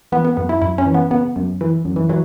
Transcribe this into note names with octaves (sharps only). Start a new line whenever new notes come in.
E3 B3
B3
F#2 B3
E4
F#2 E4
C#4
E3
B3
C#3 B3
F#2
E3
F#2
E3
E3 F#3